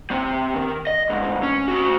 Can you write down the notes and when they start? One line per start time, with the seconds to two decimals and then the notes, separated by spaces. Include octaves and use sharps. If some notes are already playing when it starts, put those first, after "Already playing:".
0.11 C3 C4
0.56 D#3
0.87 D#5
1.10 D2 G#2
1.43 C#4
1.68 A3 F#4